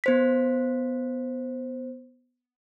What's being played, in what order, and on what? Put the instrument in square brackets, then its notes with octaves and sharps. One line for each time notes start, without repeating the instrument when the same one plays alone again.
[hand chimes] B3 C5 B6